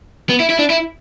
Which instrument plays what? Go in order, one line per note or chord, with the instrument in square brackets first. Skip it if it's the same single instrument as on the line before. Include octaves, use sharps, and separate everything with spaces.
[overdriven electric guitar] B3
E4
E4
D4
E4